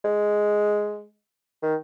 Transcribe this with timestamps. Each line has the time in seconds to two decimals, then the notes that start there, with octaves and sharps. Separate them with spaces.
0.05 G#3
1.63 D#3